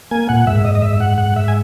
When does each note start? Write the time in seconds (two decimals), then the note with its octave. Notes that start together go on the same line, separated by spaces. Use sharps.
0.11 A#3 G#5
0.29 A#2 F#5
0.47 G#2 E5
0.64 G#2 D#5
0.75 D#5
0.82 G#2 E5
1.00 G#2 F#5
1.18 G#2 F#5
1.36 G#2 E5
1.48 G#5